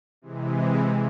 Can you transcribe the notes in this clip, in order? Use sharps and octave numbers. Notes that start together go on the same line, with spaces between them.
C3 E3 G#3